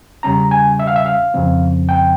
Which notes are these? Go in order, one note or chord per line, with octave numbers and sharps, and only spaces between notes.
E2 C#3 G3 C#4 A#5
G#5
E5
F5
E5
F5
F2 C#3 F3 C4
G5